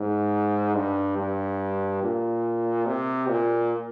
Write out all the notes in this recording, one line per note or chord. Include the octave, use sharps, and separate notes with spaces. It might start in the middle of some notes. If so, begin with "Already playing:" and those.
Already playing: G#2
G2
G2
A#2
C3
A#2